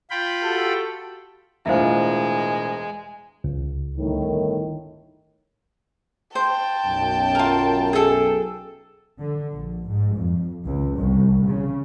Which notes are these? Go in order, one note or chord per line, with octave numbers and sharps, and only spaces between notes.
F4 G5 B5
F#4 G4 A4
E1 A2 G#3 F4 C5 D#5 E5
C#2
G1 A2 D#3
C5 G5 A5
B1 F#2
F4 A#4
G#4 A4
D3
A#1
G#2
F2
C#2
C2
C#3